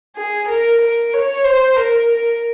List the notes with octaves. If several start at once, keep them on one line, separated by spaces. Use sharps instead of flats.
G#4
A#4
A#4
C#5
C5
A#4
A#4